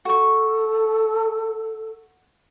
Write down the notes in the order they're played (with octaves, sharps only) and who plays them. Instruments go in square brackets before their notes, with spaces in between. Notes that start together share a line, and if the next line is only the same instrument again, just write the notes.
[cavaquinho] F#4 C#6 [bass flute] A4